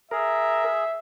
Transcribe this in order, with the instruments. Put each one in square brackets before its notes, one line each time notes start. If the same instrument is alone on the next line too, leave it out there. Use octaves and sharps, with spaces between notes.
[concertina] G#4 [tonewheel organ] A#4 [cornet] E5